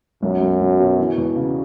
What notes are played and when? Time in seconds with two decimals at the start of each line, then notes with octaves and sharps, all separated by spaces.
0.23 B1 F#2
0.42 B1
0.61 B1
0.80 B2
0.99 E3
1.18 E2
1.36 C#3